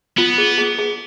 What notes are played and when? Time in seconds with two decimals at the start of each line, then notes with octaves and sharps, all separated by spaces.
0.17 B3 F4
0.38 G#4
0.58 G#4
0.78 G#4